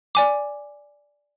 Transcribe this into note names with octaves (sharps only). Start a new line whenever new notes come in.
D5 G#5 D6